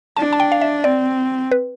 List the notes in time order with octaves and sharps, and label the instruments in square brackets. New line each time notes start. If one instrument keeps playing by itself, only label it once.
[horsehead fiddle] D4 [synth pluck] A5
[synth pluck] A5
G5
F5
E5
[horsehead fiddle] C4 [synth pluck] D5
[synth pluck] B4